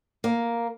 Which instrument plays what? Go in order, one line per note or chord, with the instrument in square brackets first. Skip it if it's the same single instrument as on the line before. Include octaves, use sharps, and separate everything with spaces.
[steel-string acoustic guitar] A#3